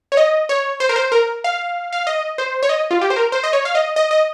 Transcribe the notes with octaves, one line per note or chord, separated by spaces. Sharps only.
C#5
D#5
C#5
C5
A#4
C5
A#4
F5
F5
D#5
C5
C#5
D#5
F4
G4
C5
A#4
C5
D#5
C#5
F5
D#5
D#5
D#5